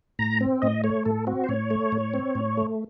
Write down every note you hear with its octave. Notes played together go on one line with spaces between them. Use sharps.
A2 A#5
C4
A2 D#5
A3 C#5
A2 A4
C4 F#4
C5
A2 C#5
A3
A2
C4
A2
A3